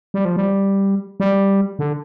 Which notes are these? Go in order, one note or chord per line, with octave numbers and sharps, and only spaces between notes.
G3
F3
G3
G3
D3